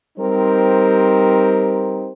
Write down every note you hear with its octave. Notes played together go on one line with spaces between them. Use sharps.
G3 C4 D#4 G4 A#4 C5